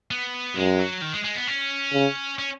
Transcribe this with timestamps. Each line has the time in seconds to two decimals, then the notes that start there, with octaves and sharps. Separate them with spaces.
0.11 B3
0.56 F#2 G#3
0.79 F#3
1.02 D#3
1.14 G#3
1.24 G#3
1.35 B3
1.47 C#4
1.93 C#3
2.38 C#4